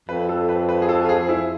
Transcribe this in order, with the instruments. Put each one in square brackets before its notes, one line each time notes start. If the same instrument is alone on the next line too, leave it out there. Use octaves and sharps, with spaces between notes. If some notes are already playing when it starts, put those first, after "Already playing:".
[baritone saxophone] F2 [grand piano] B4
[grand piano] A4
B4
B4
G#4
A4
F4
G#4
E4